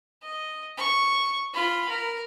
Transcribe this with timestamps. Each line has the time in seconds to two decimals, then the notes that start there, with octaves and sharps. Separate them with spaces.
0.23 D#5
0.78 C#6
1.54 F4 B5
1.89 A#4